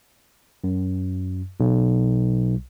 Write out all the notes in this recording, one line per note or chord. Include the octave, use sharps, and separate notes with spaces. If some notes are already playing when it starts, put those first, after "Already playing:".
F#2
B1